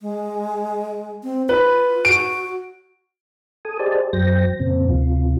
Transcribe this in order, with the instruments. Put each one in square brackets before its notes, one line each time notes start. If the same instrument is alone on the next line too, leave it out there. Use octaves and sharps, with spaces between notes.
[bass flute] G#3
C4
[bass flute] F4 [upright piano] B4
[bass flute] F#4 [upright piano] D7
[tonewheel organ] A4 G#5 D#6
G4 G#4 C5 D5 D#5 A5
F#2 F#3 C5 G5 A#6
F2 A#2 C#3 C4
D2 C3 F4